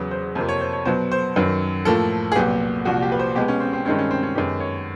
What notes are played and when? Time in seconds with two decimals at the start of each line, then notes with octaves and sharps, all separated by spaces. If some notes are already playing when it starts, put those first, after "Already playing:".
Already playing: E2 C#3 F#3 B4
0.11 C5
0.35 F2 C3 F3 A#3 C5
0.49 C#5
0.60 C5
0.73 C#5
0.85 B2 F#3 B3 C5
1.12 C5
1.36 F#2 D#3 F#3 B4
1.85 A2 F3 A#3 A4
2.32 G#4
2.35 C2 A#2 F#3 B3 G4
2.85 C2 A#2 F3 F#4
3.02 G4
3.12 B4
3.19 C5
3.35 B2 G#3 B3 G4
3.48 C#4
3.60 C4
3.73 C4
3.85 G2 D#3 G#3 C4 C#4
3.99 C#4
4.11 C4
4.23 C#4
4.35 F#2 D#3 G#3 B3 G4
4.60 C#5